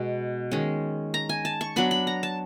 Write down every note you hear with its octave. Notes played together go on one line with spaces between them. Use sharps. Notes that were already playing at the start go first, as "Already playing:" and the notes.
Already playing: B2 G#3
D#3 G#3 C#4
A#5
G#5
A5
C#6
F#3 B3 D4 B5
B5
A#5
A5